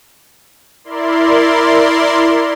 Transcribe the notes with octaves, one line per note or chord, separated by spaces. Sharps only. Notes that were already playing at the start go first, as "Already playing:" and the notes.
E4 A#4 D5 C6